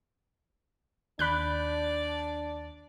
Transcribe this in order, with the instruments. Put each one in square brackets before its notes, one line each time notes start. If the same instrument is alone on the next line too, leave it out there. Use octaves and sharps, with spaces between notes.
[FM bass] D#2 [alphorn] D4 [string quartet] D5 [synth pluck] B5 F#6 G6